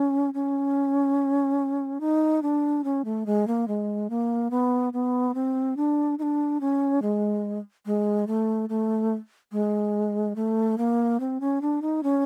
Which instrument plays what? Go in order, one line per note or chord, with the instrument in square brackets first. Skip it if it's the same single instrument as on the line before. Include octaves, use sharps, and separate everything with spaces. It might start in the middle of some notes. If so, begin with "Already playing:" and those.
Already playing: [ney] C#4
C#4
D#4
D4
C#4
A3
G#3
A#3
G#3
A#3
B3
B3
C4
D4
D#4
D4
C#4
G#3
G#3
A3
A3
G#3
A3
A#3
C4
C#4
D4
D#4
C#4